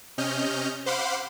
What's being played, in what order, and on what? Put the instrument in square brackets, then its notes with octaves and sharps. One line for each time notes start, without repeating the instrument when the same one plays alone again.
[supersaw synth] C3 C#4 D#5 F6 G6
C5 F5 F#5 B5 C6 D6